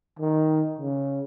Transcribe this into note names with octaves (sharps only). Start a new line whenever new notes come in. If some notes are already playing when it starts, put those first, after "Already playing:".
D#3
C#3